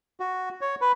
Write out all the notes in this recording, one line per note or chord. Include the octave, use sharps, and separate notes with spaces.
F#4
C#5
B4